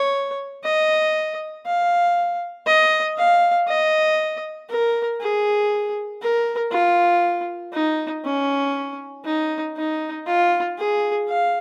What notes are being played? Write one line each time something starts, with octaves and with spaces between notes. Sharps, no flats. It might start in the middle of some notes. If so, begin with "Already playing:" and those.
Already playing: C#5
D#5
F5
D#5
F5
D#5
A#4
G#4
A#4
F4
D#4
C#4
D#4
D#4
F4
G#4
F5